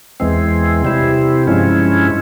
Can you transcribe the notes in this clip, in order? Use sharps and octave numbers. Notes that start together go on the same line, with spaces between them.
E2 E3 G#3 C4
C3 G3 C4 E4
G2 F3 G#3 C#4 E4